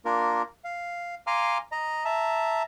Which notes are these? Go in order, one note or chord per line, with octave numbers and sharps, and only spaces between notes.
A#3 D4 F4 A#4
F5
F5 G#5 A#5 C6 D6 F6
D#5 A#5
E5 A5 A#5